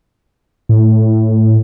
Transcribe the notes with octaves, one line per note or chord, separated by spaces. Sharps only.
A2